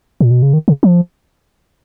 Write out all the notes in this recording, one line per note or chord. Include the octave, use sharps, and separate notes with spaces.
A#2
B2
C#3
D#3
C#3
F3